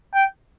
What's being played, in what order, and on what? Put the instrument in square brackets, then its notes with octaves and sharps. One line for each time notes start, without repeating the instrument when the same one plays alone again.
[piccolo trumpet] G5